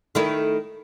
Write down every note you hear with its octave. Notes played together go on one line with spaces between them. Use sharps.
D#3 A3 E4